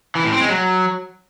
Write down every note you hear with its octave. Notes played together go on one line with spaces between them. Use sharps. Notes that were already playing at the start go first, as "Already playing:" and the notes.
E3
A2
C4
G#3
F#3